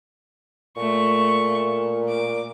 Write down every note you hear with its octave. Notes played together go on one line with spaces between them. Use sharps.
A#2 A3 C#6
D6